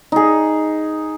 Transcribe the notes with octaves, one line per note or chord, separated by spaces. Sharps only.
D#4 G#4